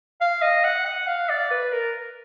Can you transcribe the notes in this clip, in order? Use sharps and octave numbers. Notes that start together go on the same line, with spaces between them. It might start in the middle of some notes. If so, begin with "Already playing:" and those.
F5
D#5
F#5
F#5
F5
D5
B4
A#4